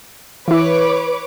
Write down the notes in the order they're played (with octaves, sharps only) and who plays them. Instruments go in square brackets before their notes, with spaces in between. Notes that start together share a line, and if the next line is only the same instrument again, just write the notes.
[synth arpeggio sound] E3 E4 [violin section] B4 C#5 D6